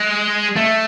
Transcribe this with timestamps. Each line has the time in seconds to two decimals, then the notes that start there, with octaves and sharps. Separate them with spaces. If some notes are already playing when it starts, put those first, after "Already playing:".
Already playing: G#3
0.56 A3